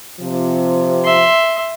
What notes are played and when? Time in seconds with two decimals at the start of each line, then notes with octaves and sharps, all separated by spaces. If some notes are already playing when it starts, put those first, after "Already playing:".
0.21 C3 F3
1.04 E5 C6